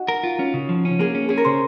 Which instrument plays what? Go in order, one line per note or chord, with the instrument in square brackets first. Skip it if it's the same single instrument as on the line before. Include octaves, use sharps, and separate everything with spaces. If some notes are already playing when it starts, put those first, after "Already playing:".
Already playing: [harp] D#4 F#4
[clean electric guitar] A#4
F4
C#4
C#3
F3
C#4
[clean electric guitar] A#3 [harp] G#4
[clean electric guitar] C#4
[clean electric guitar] C#4 [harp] G#4
[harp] A#4
[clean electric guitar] C#3 [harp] C5